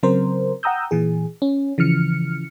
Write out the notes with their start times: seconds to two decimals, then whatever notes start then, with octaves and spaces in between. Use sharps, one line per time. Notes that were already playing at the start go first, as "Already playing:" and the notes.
0.03 C#3 F#3 C4 A#4 C5
0.63 F#5 G5 A#5 D#6 E6 G6
0.91 A#2 E3 G#4
1.42 C#4
1.78 C#3 E3 F3 F6 C#7